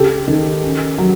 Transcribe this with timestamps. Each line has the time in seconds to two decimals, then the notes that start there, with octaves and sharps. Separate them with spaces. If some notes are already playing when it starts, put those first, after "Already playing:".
Already playing: C#2 G4 A4
0.28 D#3
0.63 C#4
0.98 F#3